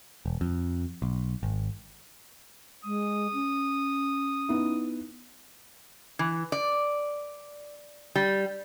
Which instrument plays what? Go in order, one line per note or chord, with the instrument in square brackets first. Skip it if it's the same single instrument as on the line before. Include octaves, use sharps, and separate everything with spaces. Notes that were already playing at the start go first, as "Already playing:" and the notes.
[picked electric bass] E1
F2
B1
G#1
[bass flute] G#3 [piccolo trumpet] D#6
[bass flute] C#4
[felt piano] B3 D#4 E4
[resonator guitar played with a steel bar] E3
D5
G3